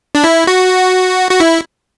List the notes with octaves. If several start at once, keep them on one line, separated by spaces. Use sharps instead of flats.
D4
E4
F#4
F#4
E4